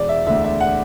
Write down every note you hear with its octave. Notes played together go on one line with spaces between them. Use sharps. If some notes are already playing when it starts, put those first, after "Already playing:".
Already playing: E1 D5
E5
D2 D3 E5
E5
F#5